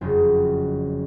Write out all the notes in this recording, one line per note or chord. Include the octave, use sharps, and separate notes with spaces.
F#1 F2 C#3 F4